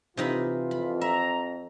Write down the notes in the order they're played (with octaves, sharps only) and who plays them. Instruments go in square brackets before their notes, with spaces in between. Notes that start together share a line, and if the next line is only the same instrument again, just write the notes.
[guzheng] C3 D#4 B5 [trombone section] E3 F4
[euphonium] F2 [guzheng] B5
[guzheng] E5 [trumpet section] A#5